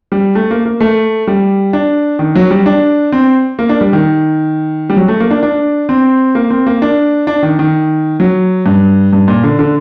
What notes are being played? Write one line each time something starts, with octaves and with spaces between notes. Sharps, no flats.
G3
A3
A#3
A#3
A3
G3
D4
D#3
F#3
G3
D4
C4
A#3
D4
G3
D#3
G3
F#3
A3
A#3
D4
D4
C4
A#3
C4
A#3
D4
D4
D#3
D#3
F#3
G2
G2
A#2
D3
D3